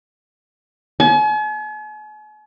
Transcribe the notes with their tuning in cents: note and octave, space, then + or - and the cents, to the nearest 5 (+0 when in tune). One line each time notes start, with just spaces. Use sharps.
G#5 +45